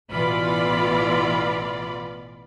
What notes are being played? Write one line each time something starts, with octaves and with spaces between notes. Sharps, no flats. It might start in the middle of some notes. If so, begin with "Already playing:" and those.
A1 B2 E3 F4 D5 B5